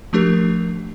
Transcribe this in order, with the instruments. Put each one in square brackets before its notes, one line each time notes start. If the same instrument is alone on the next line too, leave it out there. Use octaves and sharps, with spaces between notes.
[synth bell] F3 A3 D4 G4 A#4